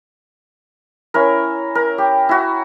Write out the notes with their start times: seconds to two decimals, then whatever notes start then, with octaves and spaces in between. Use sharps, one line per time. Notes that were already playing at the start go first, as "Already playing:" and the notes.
1.14 C#4 E4 A#4
1.75 A#4
1.98 G4
2.29 E4 F#4